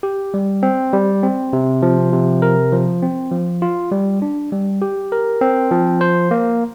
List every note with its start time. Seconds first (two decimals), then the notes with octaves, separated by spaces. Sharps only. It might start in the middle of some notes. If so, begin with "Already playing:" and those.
0.03 G4
0.34 G3
0.63 C4
0.93 G3
1.23 C4
1.53 C3
1.82 F3
2.12 C3
2.42 A#4
2.72 F3
3.02 C4
3.32 F3
3.62 F4
3.91 G3
4.22 D4
4.52 G3
4.82 G4
5.12 A#4
5.41 C4
5.71 F3
6.01 C5
6.31 A#3